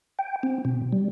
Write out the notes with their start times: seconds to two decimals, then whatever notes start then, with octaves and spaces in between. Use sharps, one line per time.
0.19 G5
0.43 C4
0.65 B2
0.93 G3